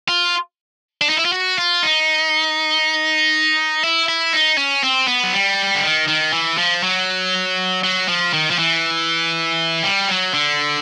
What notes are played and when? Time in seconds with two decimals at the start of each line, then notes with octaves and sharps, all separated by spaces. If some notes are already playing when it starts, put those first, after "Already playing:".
0.08 F4
1.01 D4
1.09 D#4
1.17 E4
1.25 F4
1.32 F#4
1.58 F4
1.83 D#4
3.84 E4
4.08 E4
4.33 D#4
4.57 C#4
4.83 C4
5.07 B3
5.24 F#3
5.33 G3
5.75 D3
5.83 D#3
6.08 D#3
6.33 E3
6.58 F3
6.83 F#3
7.84 F#3
8.08 F3
8.33 D#3
8.50 F3
8.59 E3
9.84 G3
10.08 F#3
10.34 D3